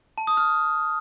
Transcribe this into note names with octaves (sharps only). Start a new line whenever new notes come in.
A5
D#6
F6